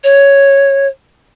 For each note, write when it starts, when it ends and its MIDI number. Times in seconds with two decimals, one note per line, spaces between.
0.04 0.87 73